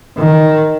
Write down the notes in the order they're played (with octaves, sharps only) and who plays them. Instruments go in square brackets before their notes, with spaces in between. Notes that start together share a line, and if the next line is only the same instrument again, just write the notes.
[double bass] D#3